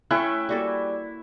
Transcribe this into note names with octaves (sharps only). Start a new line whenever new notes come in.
A3 C#4 E4 G5 G#5 C#6 F#6
G3 A#3 F#4 A4